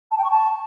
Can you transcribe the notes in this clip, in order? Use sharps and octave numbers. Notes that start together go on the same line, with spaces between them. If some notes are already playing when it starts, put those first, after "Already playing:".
A5
G5
C#6
A5